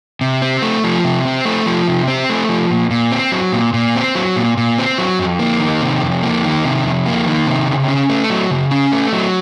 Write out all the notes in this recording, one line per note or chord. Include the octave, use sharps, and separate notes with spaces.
C3
C4
A3
F3
C3
C4
A3
F3
C3
C4
A3
F3
A#2
A#2
C4
F#3
A#2
A#2
C4
F#3
A#2
A#2
C4
F#3
F2
A#3
D#3
C3
F2
A#3
D#3
C3
F2
A#3
D#3
C3
C#3
C#4
A3
F#3
C#3
C#4
A3
F#3